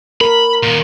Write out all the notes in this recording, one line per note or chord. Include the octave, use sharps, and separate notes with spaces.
A#4 B5
A#2 D#3